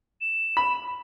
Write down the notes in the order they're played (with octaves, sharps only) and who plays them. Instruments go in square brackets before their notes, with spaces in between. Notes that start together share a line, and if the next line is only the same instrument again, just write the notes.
[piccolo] E7
[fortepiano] B5